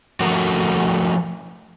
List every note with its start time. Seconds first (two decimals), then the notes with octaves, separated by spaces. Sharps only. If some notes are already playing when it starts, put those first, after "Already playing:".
0.20 F3 A3 F#4 A#4 C#5 F#5